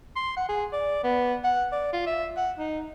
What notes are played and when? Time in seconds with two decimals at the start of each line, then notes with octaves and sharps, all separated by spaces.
0.16 C6
0.37 F#5
0.49 G#4
0.73 D5
1.04 B3
1.44 F#5
1.72 D5
1.93 F4
2.07 E5
2.37 F#5
2.58 D#4